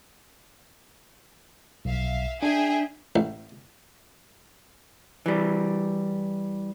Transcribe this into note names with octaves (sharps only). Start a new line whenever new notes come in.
B1 E5 F5
D4 G#4 E5 G5
A1
E3 G3